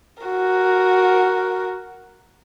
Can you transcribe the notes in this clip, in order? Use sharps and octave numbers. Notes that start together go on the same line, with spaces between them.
F#4 A#4